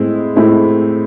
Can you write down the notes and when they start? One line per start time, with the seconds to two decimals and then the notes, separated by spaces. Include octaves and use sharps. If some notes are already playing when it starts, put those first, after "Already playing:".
Already playing: A2 G#3 C4 E4
0.36 A2 G#3 C4 E4